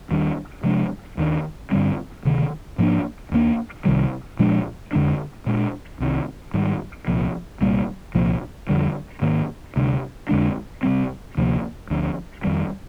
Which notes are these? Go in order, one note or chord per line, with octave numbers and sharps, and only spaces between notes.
D#2 D#3 G3 D4
C3 F3 G#3 D4
D#2 D#3 G3 D4
G2 D3 G3 C4
D2 C3 D#3
G#2 F3 A#3 D4
D#2 D#3 A#3 D4
C2 C3 D#3 G3
A#2 F3 G#3 D4
F2 D3 G#3 D4
A#2 G#3 D4
C2 C3 D#3
G#2 D#3 G3
C2 A#2 F3
C2 A#2 G3 A#3
C2 A#2 F3 A#3
F2 D3 G3
G#2 D#3 A#3
D2 C3 G3 D4
F2 D3 G#3 D4
C3 G3 C4
D2 C3 F3 A#3
D2 D3 F3
F2 D#3 G3